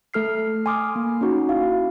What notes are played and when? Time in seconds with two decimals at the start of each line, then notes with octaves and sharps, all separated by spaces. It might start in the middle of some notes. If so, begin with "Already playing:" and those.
0.14 A3 A4 F6 C7
0.66 G#5 C6 D6 D#6 F6
0.96 A#3
1.21 C#4 D#4 F#4
1.49 E4 F5